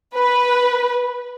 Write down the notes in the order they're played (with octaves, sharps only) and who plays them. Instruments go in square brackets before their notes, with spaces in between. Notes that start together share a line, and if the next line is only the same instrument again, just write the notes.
[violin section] B4